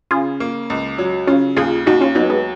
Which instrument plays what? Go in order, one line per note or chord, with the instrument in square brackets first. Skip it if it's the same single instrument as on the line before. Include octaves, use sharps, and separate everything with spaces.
[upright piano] C#3 [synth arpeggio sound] F4 G#4
[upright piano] A#3
C#2
F#3
[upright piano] C#3 [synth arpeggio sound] C#4 F4
[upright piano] D#2 [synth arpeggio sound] F4 G#4
[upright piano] D#2 [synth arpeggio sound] D#4 F#4
[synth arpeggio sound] C#4 F4
[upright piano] F#3 [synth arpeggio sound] B3 D#4
[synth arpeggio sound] G#3 B3